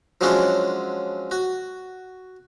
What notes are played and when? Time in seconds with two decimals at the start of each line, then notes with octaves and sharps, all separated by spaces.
0.21 F3 F#3 G#3 C#4 D4 F#4
1.31 F#4